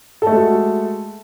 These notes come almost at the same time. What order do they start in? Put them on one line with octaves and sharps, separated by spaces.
A4 A3 G#3 F#4